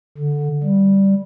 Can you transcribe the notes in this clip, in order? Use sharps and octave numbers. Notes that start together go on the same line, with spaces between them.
D3
G3